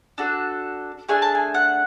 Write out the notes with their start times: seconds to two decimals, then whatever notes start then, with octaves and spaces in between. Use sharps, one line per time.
0.18 D4 F#4 A4
1.09 A3 D4 G#4 G#5
1.22 A5
1.35 G#5
1.54 F#5